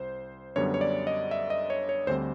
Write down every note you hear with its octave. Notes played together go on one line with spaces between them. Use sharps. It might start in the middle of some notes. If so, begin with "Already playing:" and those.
Already playing: C2 C5
F#2 D3 G3 B3 C#5
C#5
D5
D#5
E5
D#5
C#5
C#5
D2 D3 G3 C4 C5